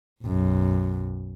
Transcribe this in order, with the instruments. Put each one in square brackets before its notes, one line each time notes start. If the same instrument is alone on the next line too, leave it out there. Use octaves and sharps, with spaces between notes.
[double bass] B1 F#2